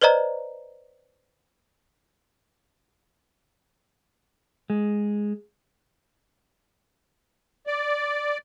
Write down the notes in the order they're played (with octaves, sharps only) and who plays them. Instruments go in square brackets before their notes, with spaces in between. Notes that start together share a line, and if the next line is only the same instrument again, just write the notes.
[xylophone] B4 C5 D5 D#5 A#5
[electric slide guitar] G#3
[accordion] D5